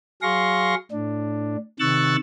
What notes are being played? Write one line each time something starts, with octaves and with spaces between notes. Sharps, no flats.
F#3 G#4 F5 C6 C#6 A#6
A2 D4
C3 D#3 C#6 E6 F#6 A6